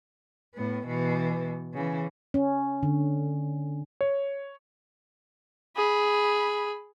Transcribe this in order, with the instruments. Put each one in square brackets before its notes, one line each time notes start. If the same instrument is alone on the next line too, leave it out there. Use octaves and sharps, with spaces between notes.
[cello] A2 B3
B2 E3
C#3 E3
[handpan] C#4
D3
[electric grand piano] C#5
[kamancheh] G#4 B5